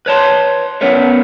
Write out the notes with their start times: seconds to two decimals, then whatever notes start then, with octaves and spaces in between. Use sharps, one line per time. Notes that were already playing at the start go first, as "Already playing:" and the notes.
0.06 B4 C#5 A5 C6
0.81 B3 C#4 A#4 B4 C#5